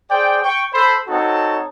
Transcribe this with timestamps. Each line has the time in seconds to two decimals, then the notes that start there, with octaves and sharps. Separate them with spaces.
0.10 G#4 C5 D5 G5
0.43 G5 C#6
0.74 A4 C5 B5
1.08 C4 D#4 F#4 A4 C#5 A5